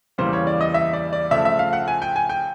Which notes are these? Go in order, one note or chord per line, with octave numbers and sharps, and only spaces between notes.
E2 C#3 E3 G3 A#3 C5
C#5
D5
D#5
E5
D5
D5
C#3 F3 A3 E5
E5
F5
F#5
G#5
G5
G#5
G5